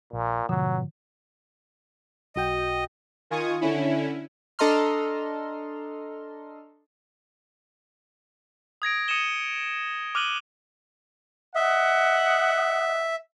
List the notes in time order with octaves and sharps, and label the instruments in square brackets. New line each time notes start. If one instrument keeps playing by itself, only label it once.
[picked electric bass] A#1 [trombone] A#2
[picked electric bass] G#2 F3 [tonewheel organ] B2 [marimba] D3 [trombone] F#3
[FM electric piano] B1 F#4 G5 [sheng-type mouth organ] D#5
[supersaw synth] D#3 F4 G#5 C#6 D#6
D3 C#4 E4
[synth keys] D4 A4 D#5 A#5 C6 F6
[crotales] D#6 G#6 A#6 D7
D#6 C#7 D#7 E7 G7
D6 F6 F#6 D#7 F#7 G7
[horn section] D#5 F#5 [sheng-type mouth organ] E5